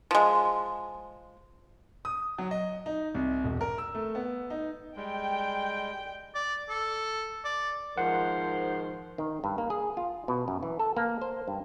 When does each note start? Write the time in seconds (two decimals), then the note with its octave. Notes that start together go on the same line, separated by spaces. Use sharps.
0.11 F3 G#3
2.05 D#6
2.38 F#3
2.51 D#5
2.86 D#4
3.14 C2
3.44 E1
3.61 A#4
3.78 E6
3.95 A3
4.15 B3
4.50 D#4
4.96 G3 G#3 G5
6.35 D5
6.69 A4
7.45 D5
7.98 G#2 D#3 F3 A#4 C5 F#5
9.18 D#3
9.44 G2
9.58 A#3
9.70 G#4
9.97 F4
10.28 B2
10.48 F#2
10.63 E3
10.79 A4
10.97 A#3
11.22 C5
11.48 G2